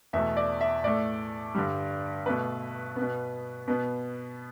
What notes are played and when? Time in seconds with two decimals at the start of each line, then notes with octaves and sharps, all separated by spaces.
0.13 E2 B2 A3 E5
0.37 D5
0.61 E5
0.84 A2 A3 D5
1.55 G2 D3 G3
2.26 B2 A3 B4
2.96 B3
3.01 B2
3.68 B2 B3